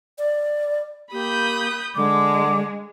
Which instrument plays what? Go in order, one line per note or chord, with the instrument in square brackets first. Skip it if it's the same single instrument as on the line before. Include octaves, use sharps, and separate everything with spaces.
[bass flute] D5
[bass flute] A#3 [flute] G4 [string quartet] B5 D#6 G6
[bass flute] D3 [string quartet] G#3 [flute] D6